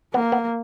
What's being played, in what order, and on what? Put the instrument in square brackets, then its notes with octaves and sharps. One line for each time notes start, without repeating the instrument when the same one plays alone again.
[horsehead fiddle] A#3 [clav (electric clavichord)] B3
[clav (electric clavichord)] B3